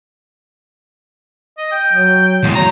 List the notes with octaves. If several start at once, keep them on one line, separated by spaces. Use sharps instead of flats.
D#5
G5
F#3
E2 G#3
F#3 A#5